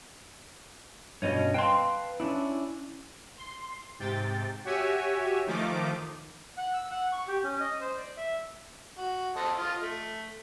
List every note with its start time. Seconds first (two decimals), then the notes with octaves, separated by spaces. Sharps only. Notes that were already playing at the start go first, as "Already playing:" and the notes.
1.22 G2 B2 C#4 C#5 D#5
1.54 B4 F5 G5 A5 C6
2.20 C#4 D4 E4
3.37 C6
3.99 G#2 C3 G5 A6
4.64 F#4 G4 C#5 E5 G#5
5.46 D#3 F3 A3 D#4 D6
6.57 F#5
6.74 E6
6.91 F#5
7.12 C#6
7.28 G4
7.44 C#4
7.60 D#5
7.81 C5
7.97 D5
8.17 E5
8.98 F#4
9.37 A4 C5 D#5
9.59 F4 D#5
9.82 A3